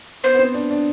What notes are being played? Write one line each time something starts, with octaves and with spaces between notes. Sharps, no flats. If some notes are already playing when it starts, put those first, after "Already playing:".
B3 C5
B3
C4
D4
D4